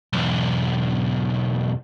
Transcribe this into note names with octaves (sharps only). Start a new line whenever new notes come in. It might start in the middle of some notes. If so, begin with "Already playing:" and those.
B1 E2